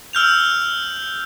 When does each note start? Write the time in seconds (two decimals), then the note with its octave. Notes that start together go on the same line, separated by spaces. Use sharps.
0.13 E6 F6 G6 F7